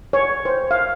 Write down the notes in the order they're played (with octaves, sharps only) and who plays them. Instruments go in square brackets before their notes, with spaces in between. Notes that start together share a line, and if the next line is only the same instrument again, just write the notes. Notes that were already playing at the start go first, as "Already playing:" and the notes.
[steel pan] C#5
C5
F5